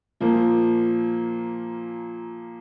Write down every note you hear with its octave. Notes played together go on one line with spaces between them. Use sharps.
A#2 F3 A#3